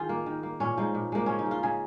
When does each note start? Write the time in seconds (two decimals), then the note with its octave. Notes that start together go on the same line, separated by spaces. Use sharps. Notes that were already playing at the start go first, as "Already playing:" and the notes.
Already playing: D#3 F4 G#4
0.09 A#3
0.26 D#3
0.43 A#3
0.60 A#2 C#4
0.77 F3 G#3 D#4
0.95 A#2
1.12 F3 G#3 A#3
1.26 C#3 C#4
1.39 D#4
1.46 G#3
1.51 F4
1.63 C#3 G#4